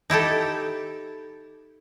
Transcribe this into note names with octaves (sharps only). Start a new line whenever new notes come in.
D#4 E4 G4 A4